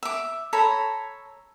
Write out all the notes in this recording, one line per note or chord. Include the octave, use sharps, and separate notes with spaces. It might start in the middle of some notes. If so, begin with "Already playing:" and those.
E5 D6
A4 C#5 A#5 B5